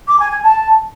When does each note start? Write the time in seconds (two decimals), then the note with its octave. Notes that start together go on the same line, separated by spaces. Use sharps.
0.08 D6
0.20 G#5
0.32 G#5
0.43 A5